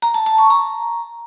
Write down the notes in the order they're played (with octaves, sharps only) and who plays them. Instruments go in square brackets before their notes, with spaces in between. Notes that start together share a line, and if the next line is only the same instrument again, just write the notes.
[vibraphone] A#5
A5
A5
C#6
A#5